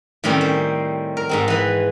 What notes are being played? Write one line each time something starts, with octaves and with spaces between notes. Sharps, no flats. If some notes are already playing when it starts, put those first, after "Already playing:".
A2 D#3 G3 C4 C#4
C5
A#4
G#2 G#3 C4
E3 B4